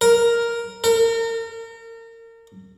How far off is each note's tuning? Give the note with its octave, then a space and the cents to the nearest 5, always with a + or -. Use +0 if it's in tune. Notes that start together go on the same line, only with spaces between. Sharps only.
A#4 +5
A#4 -35